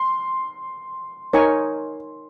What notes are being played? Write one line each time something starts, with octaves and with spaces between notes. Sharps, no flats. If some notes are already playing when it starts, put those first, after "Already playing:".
Already playing: C6
D#4 A#4 C#5 G#5 C#6